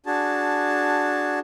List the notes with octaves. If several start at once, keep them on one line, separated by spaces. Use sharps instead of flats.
D4 F#4 G#4 A5